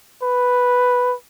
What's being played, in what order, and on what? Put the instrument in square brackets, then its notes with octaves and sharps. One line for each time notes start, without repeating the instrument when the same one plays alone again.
[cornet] B4